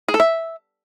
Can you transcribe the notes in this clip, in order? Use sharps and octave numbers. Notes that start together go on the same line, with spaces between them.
G#4
A4
E5